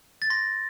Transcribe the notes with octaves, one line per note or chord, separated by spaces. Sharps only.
A6
C6 A#6